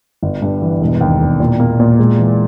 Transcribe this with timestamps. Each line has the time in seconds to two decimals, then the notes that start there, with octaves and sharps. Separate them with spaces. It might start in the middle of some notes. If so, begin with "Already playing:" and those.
0.23 G1
0.42 G2
0.62 E3
0.81 E1
1.01 D#2
1.21 E1
1.40 A#2
1.60 A#3
1.80 A#2
1.99 G#3
2.18 E3